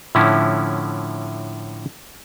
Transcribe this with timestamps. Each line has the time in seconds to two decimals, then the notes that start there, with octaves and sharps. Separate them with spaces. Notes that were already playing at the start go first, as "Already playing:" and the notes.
0.15 A2 D3 F3 C#4 E4